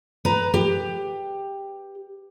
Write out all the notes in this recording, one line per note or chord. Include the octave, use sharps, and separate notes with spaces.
B4 A#5
G4